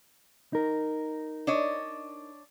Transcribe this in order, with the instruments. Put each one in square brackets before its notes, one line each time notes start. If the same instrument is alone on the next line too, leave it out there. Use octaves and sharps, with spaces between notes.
[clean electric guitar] D#4 A#4
[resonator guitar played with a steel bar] D4 C#5 D#5